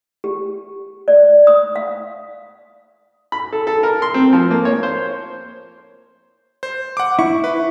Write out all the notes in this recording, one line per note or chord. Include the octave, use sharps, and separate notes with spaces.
G4
D5
D#6
F5
B5
A4
A4
A#4
C6
C4
F3
A#3
C#5
C5
C5
F#5 D6
E4 C#6
B4